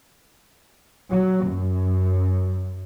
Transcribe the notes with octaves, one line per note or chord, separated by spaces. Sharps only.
F#3
F#2